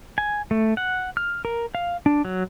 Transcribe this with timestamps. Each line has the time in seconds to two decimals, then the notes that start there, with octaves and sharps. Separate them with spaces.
0.18 G#5
0.51 A3
0.77 F#5
1.17 F6
1.45 A#4
1.75 F5
2.06 D4
2.25 F#3